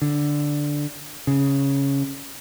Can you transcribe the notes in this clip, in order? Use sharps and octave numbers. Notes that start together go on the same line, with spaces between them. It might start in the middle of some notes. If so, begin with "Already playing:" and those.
D3
C#3